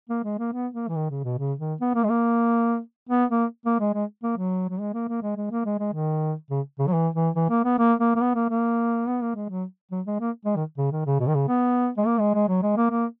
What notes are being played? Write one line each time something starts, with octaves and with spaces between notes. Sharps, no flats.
A#3
G#3
A#3
B3
A#3
E3
D#3
C#3
B2
C#3
D#3
B3
A#3
G#3
A#3
B3
A#3
A#3
G#3
G#3
A#3
F#3
F#3
G#3
A#3
A#3
G#3
G#3
A#3
G#3
G#3
D#3
C#3
C#3
F#3
E3
E3
E3
A#3
B3
A#3
A#3
A#3
B3
A#3
A#3
B3
A#3
G#3
F#3
F#3
G#3
A#3
G#3
D#3
C#3
D#3
C#3
B2
D#3
C#3
B3
G#3
A#3
G#3
G#3
F#3
G#3
A#3
A#3